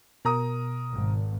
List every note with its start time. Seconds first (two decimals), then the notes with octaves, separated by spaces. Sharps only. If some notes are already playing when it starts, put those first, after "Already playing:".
0.25 B2 A#4 A#5 D#6
0.92 G#1